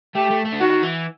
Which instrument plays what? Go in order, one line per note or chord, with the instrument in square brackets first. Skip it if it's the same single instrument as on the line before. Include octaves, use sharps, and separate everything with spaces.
[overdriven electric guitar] A3 [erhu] G4
[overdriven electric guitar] A3
A3
D3
[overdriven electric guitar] D#3 [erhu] F#4
[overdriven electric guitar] E3